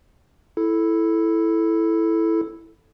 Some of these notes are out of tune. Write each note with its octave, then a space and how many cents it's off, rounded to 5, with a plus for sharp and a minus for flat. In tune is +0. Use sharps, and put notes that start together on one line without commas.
E4 +0 A4 -5